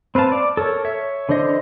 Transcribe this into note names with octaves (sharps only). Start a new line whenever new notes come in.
C4 B4 C5 F5 A5
D5
A4 A#4 C#5
C#5 E5
D3 E3 D4 C5 D#5